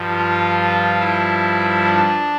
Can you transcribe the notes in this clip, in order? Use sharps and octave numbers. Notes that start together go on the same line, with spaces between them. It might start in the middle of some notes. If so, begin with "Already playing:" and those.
Already playing: G2 F3
F4
E4
D4